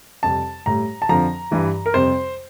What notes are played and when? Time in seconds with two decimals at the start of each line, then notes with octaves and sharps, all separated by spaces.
0.23 F2 C3 G3 A5
0.66 A2 G3 A#5
1.02 A5
1.09 F2 D3 F3 A#5
1.51 G2 E3 G3
1.86 A#4
1.94 F2 C3 G3 C5